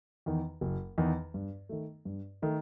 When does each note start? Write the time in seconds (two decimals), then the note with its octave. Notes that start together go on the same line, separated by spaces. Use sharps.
0.26 E2 D#3
0.61 F#1
0.98 E2 D#3
1.34 G2
1.69 D#3 A3
2.05 G2
2.42 D#3 A3